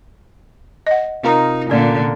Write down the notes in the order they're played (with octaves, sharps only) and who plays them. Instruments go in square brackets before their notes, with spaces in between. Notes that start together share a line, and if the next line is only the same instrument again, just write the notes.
[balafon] D#5 F#5
[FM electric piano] C3 F4 A#4 [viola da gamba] D#4
[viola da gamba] A#2 D3 [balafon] C#4 D5